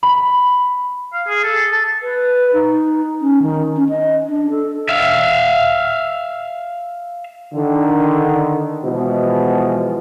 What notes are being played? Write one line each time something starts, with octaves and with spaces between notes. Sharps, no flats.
B5
F5
G#4
A4
A5
B4
D#4
C#4
D#3
C#4
D#5
D4
A4
E5 F5
D3 D#3
B2 E3 F3 G#3